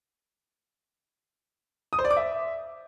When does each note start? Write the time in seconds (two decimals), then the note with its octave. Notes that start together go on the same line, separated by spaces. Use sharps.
1.93 D#6
1.99 C5
2.05 D5
2.11 D6
2.17 E5